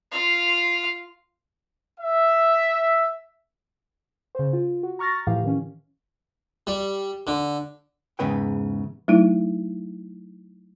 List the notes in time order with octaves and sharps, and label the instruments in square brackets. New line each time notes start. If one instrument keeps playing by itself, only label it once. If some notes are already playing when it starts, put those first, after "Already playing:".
[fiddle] F4 F5
[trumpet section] E5
[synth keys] C#3 C5
F4
F#4
A#5 C#6 F6 A6 A#6
A2 E3 F3 G4 F5
D#3 E3 C#4
[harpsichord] G3
D3
[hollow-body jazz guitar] E2 G#2 C#3 B4 G5
[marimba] F#3 A3 D#4 E4